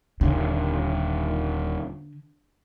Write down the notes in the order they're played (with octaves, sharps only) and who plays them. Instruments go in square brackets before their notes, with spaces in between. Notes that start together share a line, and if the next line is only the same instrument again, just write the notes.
[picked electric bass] D#1 [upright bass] D3